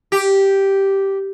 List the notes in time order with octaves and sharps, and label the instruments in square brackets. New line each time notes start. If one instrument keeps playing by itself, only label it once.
[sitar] G4